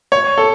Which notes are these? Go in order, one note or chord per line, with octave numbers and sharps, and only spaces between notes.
C#5
A4